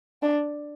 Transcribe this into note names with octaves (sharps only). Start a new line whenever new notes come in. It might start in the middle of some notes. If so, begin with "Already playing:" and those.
D4